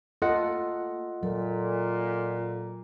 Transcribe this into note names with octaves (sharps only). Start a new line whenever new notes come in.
A#3 F4 A4 D#5 F#5
A#2 F#3 A4